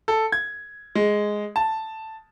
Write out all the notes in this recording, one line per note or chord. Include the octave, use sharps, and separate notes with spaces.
A4
G#6
G#3
A5